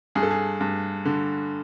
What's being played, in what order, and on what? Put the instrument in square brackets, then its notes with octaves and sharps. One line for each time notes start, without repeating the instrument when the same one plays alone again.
[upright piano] G2 G#4
A4
G#4
G2
D3